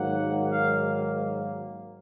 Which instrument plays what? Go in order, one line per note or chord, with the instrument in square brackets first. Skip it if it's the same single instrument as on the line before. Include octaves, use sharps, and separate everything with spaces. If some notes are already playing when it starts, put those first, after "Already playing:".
Already playing: [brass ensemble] G#2 D#3 F#3 A#3 F#5
F5